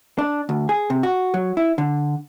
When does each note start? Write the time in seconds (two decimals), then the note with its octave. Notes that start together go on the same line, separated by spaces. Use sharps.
0.18 D4
0.49 D2
0.69 G#4
0.90 C3
1.03 F#4
1.34 F#3
1.57 E4
1.78 D3